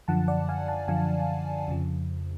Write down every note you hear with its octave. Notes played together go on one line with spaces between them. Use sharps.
F#2 D3 F3 F#5 A5
D5 F#5
F5 G#5
F#5 A5
F#2 D3 F3 F5 G#5
F2 C#3 F3